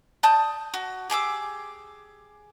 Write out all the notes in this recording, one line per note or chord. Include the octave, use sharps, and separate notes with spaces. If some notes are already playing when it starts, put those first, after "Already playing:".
D5 A5 D#6 G6
F#4
G4 G#4 D6 E6